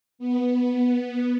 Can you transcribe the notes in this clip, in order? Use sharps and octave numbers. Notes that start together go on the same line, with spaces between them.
B3